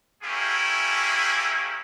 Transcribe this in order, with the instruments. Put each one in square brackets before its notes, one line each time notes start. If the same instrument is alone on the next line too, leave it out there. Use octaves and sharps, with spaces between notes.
[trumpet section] A3 A#3 C#4 E4 G4 G#4